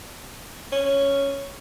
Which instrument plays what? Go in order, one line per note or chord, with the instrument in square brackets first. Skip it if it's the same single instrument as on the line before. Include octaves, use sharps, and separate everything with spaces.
[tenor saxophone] C#4